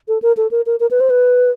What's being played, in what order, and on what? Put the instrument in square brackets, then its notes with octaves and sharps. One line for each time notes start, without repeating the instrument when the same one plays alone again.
[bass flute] A4
A#4
A4
A#4
A#4
A#4
B4
C5
B4